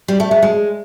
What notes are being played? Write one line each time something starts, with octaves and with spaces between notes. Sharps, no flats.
G3
A3
G#3
G#3